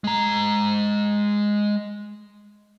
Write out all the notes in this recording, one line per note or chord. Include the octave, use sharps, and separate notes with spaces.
G#3 A#5